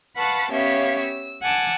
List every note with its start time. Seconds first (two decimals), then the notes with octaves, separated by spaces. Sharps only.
0.17 B4 F5 F#5 A5 B5 C#6
0.51 B3 C#4 G4 C#5 E5 F5
1.00 E6
1.43 F#5 G#5 A5 D6 E6